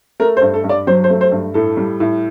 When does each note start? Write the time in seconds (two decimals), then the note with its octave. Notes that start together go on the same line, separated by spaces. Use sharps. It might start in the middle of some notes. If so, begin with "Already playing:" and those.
0.20 A3 A#4
0.37 C5
0.42 G2
0.54 A4
0.64 G2
0.69 D5
0.87 F#3 C5
1.04 C5
1.10 A3
1.21 C5
1.32 G2
1.54 A2 A4
1.77 G3
2.00 A2